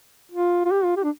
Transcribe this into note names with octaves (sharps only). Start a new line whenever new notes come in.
F4
F4
G4
F4
G4
D4